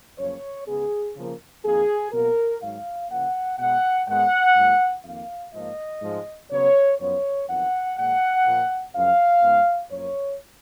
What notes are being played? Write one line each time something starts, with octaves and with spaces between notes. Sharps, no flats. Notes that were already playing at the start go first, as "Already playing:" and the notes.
F#2 C#3 F3 A#3 C#5
C#3 G#3 B3 G#4
C#3 F3 A#3
F2 D#3 A#3 G#4
B2 F#3 A#3 A#4
G#2 D#3 F#3 F5
C#3 F3 A#3 F#5
B2 G#3 B3 F#5
G#2 D#3 G#3 B3 F#5
G#2 F#3 A#3
F2 D#3 A#3 F5
G#2 F3 A#3 D#5
G#2 F3 G#3
C#3 F#3 B3 C#5
F#2 F3 B3 C#5
F2 D#3 F#3 B3 F#5
A#2 F3 G#3 F#5
A#2 F3 A#3
F#2 C#3 F3 F5
G#2 F3 B3
F#2 F3 A#3 C#5